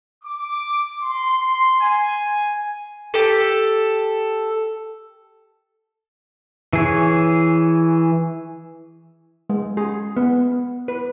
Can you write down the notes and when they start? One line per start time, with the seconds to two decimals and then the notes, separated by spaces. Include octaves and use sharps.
0.24 D6
1.02 C6
1.81 G#5
3.14 G4 A4
6.73 E3 G#4 C#5
9.50 G#3
9.77 G#4
10.17 B3
10.88 B4